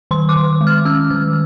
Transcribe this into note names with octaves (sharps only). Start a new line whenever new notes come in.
D#3 C6
D6
D#3
G#3
F6
C#4 E6
D#3 F6